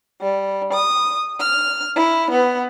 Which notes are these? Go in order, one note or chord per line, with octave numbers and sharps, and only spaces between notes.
G3
D#6
F6
E4
B3